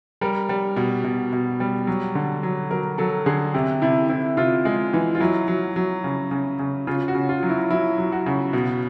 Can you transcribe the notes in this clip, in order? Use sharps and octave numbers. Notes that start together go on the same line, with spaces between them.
G3 A#4
G3
B2
B2
B2
G3
F#3
D3
F#3
F#3 A#4
F#3 A4
D3 G#4
C3 G4
C3 E4
C3 E4
C3 F4
G#3
E3
F4
F#3 E4
F#3
F#3
C#3
C#3
C#3
C#3 F4
F#4
C#3
F4
F#3
E4
F#3 E4
F#3
F#4
C#3
B2